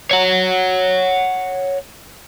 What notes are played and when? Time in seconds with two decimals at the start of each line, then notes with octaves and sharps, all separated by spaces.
0.11 C#5 F#5